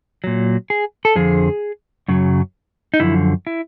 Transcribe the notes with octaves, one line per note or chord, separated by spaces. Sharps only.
A#2 F#3
G#4
A4
F2 D3 F3 G#4
F#2 C#3 F#3
D#4
F#2 D3 F3 E4
E4